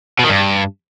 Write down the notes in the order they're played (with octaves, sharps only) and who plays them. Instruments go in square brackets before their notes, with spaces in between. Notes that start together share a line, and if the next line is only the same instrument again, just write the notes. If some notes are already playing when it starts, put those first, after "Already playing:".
[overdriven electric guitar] B2
D#3
G2